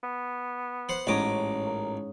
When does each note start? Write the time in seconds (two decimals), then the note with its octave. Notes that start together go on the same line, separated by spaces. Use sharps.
0.03 B3
0.89 C5 F#5
1.07 A1 G#2 C#4 D#5 A#5 D6
1.67 A#4